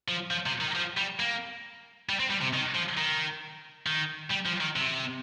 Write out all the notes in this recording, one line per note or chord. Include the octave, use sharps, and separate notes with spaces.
F3
F3
C3
D#3
F3
G3
A#3
G3
C4
G3
C3
D#3
F3
D#3
D#3
G3
F3
D#3
C3